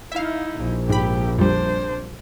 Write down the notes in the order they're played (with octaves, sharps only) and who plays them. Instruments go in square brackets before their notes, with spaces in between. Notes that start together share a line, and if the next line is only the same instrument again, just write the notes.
[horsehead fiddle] D#4 E4 [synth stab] E5 F5
[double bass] A#1
[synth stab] G#2 B5 [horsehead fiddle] G4
[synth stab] F2 G3 [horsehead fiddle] D4 C5